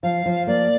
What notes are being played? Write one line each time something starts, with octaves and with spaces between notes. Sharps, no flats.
F3 F5
F3
A#3 D5